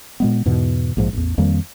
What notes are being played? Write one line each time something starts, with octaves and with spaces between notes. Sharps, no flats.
A#2 G#3 B3
E2 G#2 B2 E3
A#1 G#2 F3
A1 E2
F2 D#3 G3 A#3